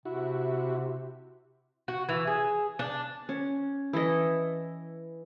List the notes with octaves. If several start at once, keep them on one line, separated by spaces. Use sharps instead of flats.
C3 E4 F#4
F#4
E3
G#4
D4
C#4
E3 E4 A4 D#5